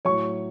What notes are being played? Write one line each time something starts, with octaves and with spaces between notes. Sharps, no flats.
A2 F#3 C#5 C#6